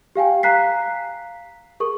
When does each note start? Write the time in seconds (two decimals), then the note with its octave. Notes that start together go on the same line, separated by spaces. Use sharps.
0.15 G4 F5 G5 G#5
0.43 F5 A#5 F#6 B6 C7
1.80 G#4 A#4 C#6